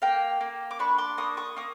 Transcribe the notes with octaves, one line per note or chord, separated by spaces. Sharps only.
A#3 F5 G5
A#3
D6
D4 B5 C#6
C6 D6
A#3 C#6 D#6
C#6 D#6
A#3 C#6 D#6